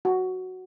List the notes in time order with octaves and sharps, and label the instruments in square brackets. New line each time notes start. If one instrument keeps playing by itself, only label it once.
[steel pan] F#4